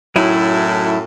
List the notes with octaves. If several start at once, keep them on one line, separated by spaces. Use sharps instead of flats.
F#2 A2 F#3 D#4 E4